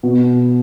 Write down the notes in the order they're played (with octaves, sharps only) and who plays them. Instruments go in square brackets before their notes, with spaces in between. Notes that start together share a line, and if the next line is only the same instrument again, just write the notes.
[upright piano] B2